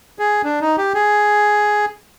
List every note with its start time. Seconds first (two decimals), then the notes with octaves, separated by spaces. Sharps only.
0.19 G#4
0.44 D4
0.61 D#4
0.78 G4
0.94 G#4